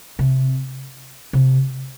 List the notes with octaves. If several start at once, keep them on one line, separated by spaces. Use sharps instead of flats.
C3
C3